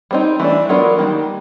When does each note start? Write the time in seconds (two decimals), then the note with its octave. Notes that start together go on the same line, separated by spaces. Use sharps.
0.11 G3 C4 D#4
0.40 E3 A3 D4
0.69 F#3 B3 D4 F4 A#4
0.99 D#3 G3 A#3